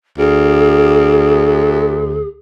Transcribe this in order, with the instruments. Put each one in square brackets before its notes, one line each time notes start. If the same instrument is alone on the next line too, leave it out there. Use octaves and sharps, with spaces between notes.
[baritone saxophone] D2 [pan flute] G#4